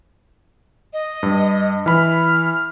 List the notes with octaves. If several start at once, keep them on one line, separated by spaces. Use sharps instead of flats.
D#5
G2
E3 B5 F6